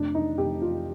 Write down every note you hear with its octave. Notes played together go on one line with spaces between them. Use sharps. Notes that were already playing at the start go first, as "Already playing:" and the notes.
Already playing: F1 D4
D#4
F1 G4
F4